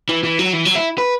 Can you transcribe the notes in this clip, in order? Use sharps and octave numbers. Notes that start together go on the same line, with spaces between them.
E3
E3
F#3
E3
F#3
E4
B4